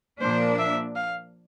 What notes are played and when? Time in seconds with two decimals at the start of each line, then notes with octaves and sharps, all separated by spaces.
0.20 A#2 F3 A#3 D4 C5
0.59 E5
0.96 F5